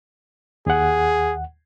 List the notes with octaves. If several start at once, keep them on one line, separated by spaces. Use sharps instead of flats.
D#2 G#4 F#5